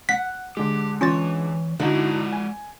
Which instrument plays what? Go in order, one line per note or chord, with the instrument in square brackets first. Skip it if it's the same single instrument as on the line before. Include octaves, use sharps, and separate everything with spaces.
[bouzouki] F#5 [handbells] B6
[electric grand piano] D3 G#3 [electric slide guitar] G4
[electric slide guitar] E3 [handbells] C#4 F4 A6 [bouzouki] C#5
[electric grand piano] D3 D#4 F#4 [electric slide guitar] G#3 D5 F#5 [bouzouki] E4
[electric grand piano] G#5